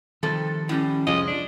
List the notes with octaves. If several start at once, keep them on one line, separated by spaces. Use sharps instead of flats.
C3 D#3 F3 G3 A4
A2 G3 C#4
C2 F2 F3 G#3 D#5
D4